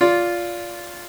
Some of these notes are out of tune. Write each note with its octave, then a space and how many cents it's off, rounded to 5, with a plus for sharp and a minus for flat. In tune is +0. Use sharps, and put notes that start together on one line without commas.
F4 +0 D5 -20